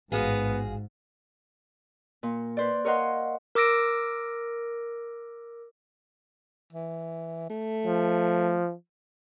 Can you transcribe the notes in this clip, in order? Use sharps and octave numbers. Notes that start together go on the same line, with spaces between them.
A1 G#2 B3 F4 F#4 G#4 F5
A#2
B4 C5 D5
A#4 C#5 D#5 F5 F#5 C6
A#4 D6 E6 A#6 D7
E3
A3
F3